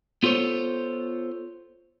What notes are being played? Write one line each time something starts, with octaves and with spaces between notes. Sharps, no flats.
B3 F4 A4 C5 C#5